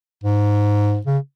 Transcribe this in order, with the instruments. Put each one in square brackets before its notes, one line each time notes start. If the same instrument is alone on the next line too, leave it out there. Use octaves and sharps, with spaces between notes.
[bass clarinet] G#2
C#3